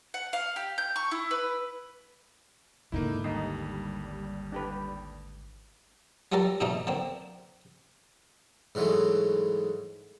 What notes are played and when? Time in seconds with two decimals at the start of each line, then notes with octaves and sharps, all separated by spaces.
0.14 F#5
0.33 F5
0.56 G4
0.78 G6
0.96 C#6
1.11 E4
1.31 B4
2.92 G#1 D3 A#3 D#4 E4
3.24 D#2 G3 D#4
4.52 D4 G4 B4
6.32 F#3 G3 F4 A4 A#4 D5
6.60 G#2 B2 E3 A3 D4 D#4
6.87 D3 A#3 C4
8.75 G#2 E3 F#3 G#3 A3